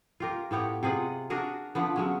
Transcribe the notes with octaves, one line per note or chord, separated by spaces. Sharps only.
F4 G4 A#4
A2 B3 G4 C#5
C3 F4 G#4 F#5
D4 F#4 G#4 A#4
D3 F3 B3
F#3 G#3 C#4